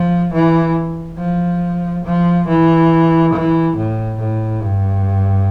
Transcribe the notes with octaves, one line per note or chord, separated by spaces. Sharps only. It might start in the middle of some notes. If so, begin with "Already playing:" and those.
Already playing: F3
E3
F3
F3
E3
E3
A2
A2
G2